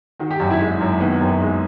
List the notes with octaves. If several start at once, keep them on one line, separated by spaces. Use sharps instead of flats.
D#3 F#4
G4
F#2 F#4
E4
G#3
F#2
D#3 B3
F#2
G#3